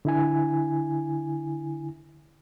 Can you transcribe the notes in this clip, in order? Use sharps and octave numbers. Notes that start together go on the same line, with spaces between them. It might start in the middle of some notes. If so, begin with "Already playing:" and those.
D3 E4 G#5